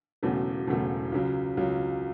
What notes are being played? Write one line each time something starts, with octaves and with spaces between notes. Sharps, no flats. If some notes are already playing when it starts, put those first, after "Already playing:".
E1 E2 C#3 F#3 A3
E1 E2 C#3 F#3 A3
C#2 C#3 F#3
C#2 C#3 F#3